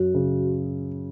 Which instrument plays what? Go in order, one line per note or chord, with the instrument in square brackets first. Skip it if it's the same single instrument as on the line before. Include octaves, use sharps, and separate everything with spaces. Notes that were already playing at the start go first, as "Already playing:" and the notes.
Already playing: [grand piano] F#2 [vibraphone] F#4
[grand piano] C#3